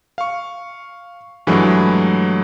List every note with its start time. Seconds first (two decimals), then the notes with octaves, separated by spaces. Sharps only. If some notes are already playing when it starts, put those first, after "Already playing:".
0.18 F5 C#6
1.47 G2 E3 F#3 G#3 A3